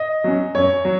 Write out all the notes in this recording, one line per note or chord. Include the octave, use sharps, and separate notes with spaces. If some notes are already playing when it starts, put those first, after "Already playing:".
Already playing: D#5
F#3 C#4
F#2 C#5
F#3